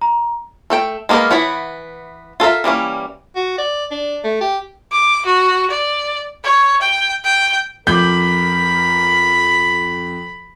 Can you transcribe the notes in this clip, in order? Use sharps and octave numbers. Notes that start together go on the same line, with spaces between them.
A#5
A3 A4 G5
G#3 A#3 B3 G#4 A#4
E3 B3 E4 C#5 F#5
F4 A4 A#4 E5
E3 G3 A#3 C#4
F#4
D5
D4
A3
G4
D6
F#4
D5
C#5
G5
G5
F2 A#4 B5 D6 G6